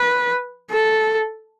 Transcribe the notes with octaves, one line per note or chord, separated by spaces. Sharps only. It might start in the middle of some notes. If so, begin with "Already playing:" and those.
Already playing: B4
A4